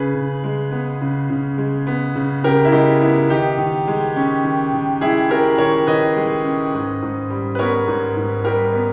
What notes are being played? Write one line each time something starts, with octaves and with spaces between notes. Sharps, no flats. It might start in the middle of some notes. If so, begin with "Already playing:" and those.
Already playing: C#3 G#4 B4
C#3
G#3
B3
C#3
C#3
G#3
B3
C#3
C#3 G4 A#4
E4
G#3 D#4 G4
B3 E4
D#3 D#4 G4
D#3
G#3
C#4
D#3
D#3
G#3 E4 G#4
C#4 G4 A#4
D#3 A#4 C#5
D#3 B4 D#5
G#3
C#4
G#2
G#2
G3
B4
B3 A#4 C#5
G#2
G#2
G3 G4 A#4
B3